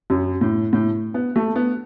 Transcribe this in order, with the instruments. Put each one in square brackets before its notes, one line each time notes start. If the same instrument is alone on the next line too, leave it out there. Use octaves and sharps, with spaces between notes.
[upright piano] F#2
A2
A2
B3
A3
B3